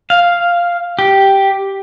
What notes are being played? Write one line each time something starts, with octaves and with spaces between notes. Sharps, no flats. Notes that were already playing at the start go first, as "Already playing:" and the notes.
F5
G4